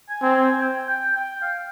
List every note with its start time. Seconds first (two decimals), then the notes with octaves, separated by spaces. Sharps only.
0.09 G#5
0.22 C4
0.36 G#5
0.62 G5
0.89 G5
1.16 G5
1.42 F5